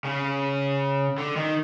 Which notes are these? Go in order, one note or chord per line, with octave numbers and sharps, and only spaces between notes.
C#3
D3
D#3